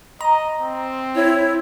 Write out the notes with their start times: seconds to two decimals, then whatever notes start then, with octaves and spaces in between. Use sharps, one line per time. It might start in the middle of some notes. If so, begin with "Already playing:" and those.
0.21 D#5 A#5
0.61 C4
1.15 E4 C#5